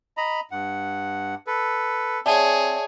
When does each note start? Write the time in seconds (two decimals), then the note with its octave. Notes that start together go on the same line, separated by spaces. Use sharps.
0.17 D#5 A#5 B5
0.51 G2 F#5
1.47 A4 B4
2.26 C4 G#4 C#5 D5 E5 A5